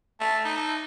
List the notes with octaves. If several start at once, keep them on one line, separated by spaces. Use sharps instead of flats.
A3
D#4